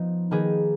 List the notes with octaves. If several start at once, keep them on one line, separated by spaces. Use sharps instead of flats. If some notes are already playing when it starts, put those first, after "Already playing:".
Already playing: F3 B3 D#4
D#3 A#3 D#4 G#4 B4